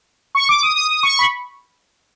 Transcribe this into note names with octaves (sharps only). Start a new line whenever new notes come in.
C#6
D6
D#6
D#6
D#6
C#6
B5